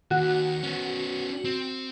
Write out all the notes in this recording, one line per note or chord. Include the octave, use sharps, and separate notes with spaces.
D#2 F#4
B3 C#4
C4